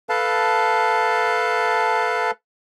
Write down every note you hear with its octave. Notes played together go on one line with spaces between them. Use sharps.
A4 B4 F5 A5